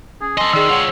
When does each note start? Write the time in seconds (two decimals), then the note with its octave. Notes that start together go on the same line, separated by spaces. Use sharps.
0.21 C#4 G#4
0.38 A4 D#5 G#5 C6
0.53 D#3 G#4 D5 E6
0.69 F4 C#5 F#5 G5